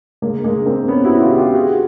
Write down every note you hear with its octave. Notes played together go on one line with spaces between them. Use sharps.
G#3 A#3
G#3 A#3
A#3 C4
B3 C#4
E4 F#4
F4 G4
F4 G4
F#4 G#4